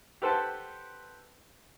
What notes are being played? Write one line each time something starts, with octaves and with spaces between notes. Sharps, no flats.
G4 A4 B4 C5 F#5 A5